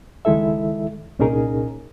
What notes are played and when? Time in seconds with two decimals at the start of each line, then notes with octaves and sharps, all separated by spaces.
0.25 C#2 D#3 G#3 E4 A4 E5
1.19 C2 A#2 C#4 D#4 G#4 A#4